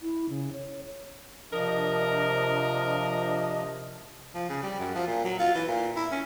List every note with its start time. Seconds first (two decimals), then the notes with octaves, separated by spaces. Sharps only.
0.01 E4
0.29 C#3
0.53 C#5
1.53 C3 F3 D4 A#4 D#5
4.34 F3
4.49 C#3
4.63 G3
4.80 F#2
4.95 F3
5.07 A#2
5.24 F#3
5.39 F4
5.55 E3
5.67 A#2
5.96 E4
6.12 C#4